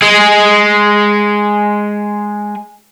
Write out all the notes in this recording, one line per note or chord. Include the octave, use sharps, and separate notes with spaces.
G#3 G#4